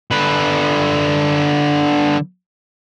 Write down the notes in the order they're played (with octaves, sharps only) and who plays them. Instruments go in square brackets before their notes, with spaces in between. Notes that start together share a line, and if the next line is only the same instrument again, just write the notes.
[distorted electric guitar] D3 B4